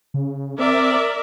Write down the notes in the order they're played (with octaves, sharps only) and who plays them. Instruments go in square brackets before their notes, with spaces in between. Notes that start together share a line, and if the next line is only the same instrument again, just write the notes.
[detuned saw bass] C#3
[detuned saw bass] C4 [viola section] A#4 D5 E5